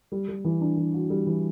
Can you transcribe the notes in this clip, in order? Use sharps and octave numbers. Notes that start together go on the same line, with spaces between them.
G3
G3
E3
D4
E3
F#4
G3
E3